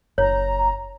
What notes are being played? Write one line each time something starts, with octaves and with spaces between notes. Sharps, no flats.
F#1 C#5 A#5